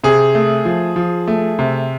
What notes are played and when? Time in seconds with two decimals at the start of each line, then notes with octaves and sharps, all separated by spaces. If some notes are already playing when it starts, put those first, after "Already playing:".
0.04 C3 G#4
0.35 A3
0.65 F3
0.96 F3
1.27 A3
1.59 C3